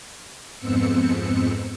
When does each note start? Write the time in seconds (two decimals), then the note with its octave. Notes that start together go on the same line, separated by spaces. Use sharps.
0.58 F2 G#2 B3 C4 E6 C#7